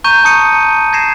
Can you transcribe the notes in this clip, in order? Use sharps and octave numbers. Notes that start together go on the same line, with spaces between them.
A#5 C#6 G6 D#7
A5 A#5 D#6 C#7 D#7
G#6 A#6 C7 E7